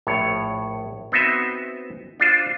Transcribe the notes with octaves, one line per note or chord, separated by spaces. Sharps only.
A#1 A2 C#5
B3 C4 D#4 F#4 D#5 E5
D4 F4 C5